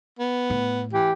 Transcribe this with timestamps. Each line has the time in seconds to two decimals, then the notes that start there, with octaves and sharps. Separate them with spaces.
0.19 B3
0.50 A2
0.93 E3 G4